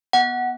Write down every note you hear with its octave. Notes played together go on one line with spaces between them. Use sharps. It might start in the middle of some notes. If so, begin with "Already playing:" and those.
B3 F#5